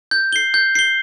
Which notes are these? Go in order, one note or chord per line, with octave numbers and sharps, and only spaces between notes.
G6
C7 G7
G6
C7 G7